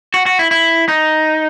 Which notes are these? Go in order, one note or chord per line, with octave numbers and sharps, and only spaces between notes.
F#4
F#4
E4
E4
D#4